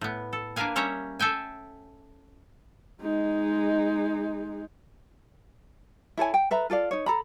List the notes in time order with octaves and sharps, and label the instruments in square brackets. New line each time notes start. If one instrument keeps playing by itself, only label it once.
[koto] A2 B3
A4
A#3 D4 A#4 B4 F5 G#5
G3 C#4 C#5 E5 A#5
A4 E5 G5 G#5
[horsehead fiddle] G#3 D#4
[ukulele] E4 A4 C#5 G#5
G5
A4 B4 E5 A#5
F4 A4 D5 F5
D#4 C#5
A4 A#5 B5